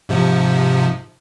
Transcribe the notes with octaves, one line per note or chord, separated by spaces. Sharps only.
G#2 C3 F3